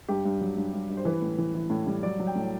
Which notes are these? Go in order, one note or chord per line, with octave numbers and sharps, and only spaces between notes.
G2 G4
G2
F#3
G2
G2
G2
C5
E3 B4
A2
E3
E3
A2
G3
F#3 D5
F#3
G5
A2